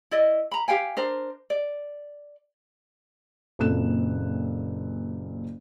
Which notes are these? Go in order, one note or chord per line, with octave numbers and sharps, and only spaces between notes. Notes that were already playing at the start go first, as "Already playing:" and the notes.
E4 D5 D#5
A#5 B5
G4 F5 G5 G#5
D4 A#4 C5
D5
F#1 A#2 C4 A4 F#6 E7